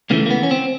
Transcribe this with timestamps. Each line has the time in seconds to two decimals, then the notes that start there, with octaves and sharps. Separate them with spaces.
0.10 C#2 C#3 E3 A3 A#3
0.26 A#3
0.31 B3
0.43 C#4
0.51 C4